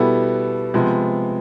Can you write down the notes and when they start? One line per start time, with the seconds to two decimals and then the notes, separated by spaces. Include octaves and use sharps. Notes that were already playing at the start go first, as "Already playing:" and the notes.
Already playing: B2 G3 B3 E4 A4
0.74 C3 F3 G#3 B3